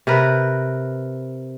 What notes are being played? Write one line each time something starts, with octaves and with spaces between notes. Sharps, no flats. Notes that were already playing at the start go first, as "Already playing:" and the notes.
C3 A#4 B4